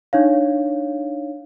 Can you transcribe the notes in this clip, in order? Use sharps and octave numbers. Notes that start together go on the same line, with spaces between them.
D4 D#4 C#5 F5